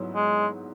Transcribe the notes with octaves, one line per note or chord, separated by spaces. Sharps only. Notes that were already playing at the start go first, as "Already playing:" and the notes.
Already playing: G#2 F#3 B3 E4
G#3